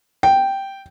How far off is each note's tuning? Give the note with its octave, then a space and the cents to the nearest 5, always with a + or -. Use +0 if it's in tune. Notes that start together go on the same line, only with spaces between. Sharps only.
G5 -5